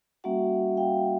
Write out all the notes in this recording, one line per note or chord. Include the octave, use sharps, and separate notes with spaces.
G3 A#3 C#4 F#4 E5 F#5
F5 G5